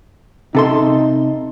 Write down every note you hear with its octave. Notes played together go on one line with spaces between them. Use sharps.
C3 D#4 A4 C6